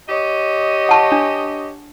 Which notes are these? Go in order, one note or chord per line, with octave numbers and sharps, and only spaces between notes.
G4 C#5 D#5
F#5 A5 C#6
D4